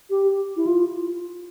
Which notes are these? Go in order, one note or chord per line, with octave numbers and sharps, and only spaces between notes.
G4
E4
F4